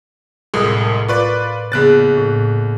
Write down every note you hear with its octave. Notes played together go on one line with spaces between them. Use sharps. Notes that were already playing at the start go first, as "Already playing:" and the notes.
C2 F2 A2 G#3 A#4 D#6
F4 B4 D5 C#6 D6
A#1 C#3 B3 G#4 F#6 A6
A2